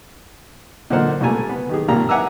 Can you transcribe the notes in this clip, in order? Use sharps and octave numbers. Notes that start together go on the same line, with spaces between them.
A#2 D3 D#4 A#4 C5 F#5
C#2 A#2 G3 A3 G#5 A#5
B3
D#3 G4 G#4
G#1 A#2 A#3 G4 A#5
E5 F#5 G#5 A#5 D6 E6